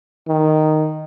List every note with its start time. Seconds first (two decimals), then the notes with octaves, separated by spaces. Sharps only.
0.28 D#3